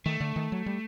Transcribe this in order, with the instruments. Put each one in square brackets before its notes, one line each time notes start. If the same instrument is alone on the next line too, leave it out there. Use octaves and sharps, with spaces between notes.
[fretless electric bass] D#3 [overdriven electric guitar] A3
[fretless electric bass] D3
D#3
F#3
G3